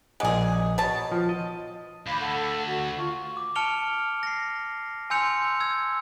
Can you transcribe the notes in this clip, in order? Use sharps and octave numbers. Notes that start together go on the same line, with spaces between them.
A#1 G#3 G#4 D5 F#5
B2 C#5 A5
F3
D#5
D2 F5 B5 D6
A4 F#5
F#4
F4 C#6
D6
A5 F6 C#7 D7 F7 G7
A#6 C7
G#5 C6 E6 G6 C#7 F7
E6 G#6